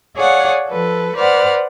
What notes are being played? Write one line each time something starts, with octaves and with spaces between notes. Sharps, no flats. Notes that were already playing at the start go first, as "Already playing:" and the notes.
G#4 C#5 D5 F5 F#5
F3 A4 B4
B4 C5 D5 F#5 F6